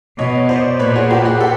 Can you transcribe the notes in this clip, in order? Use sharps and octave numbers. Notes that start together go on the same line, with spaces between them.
B2 C#5 D#5
C5 D5
A#2 B4 C#5
F#4 G#4
F4 G4
F#4 G#4
G4 A4